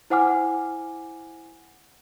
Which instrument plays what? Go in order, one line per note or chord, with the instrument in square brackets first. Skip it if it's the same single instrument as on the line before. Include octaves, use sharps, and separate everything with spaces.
[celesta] E4 C5 F#5 G#5 D6 F6